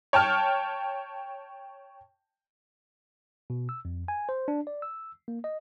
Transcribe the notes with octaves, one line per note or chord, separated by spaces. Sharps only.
C#5 G5 A5 F6
B2
E6
F2
G#5
C5
D4
D5
E6
A#3
D#5